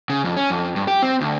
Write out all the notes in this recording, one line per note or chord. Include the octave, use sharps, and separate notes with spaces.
C#3
F2
C#4
F2
G2
G4
C4
D2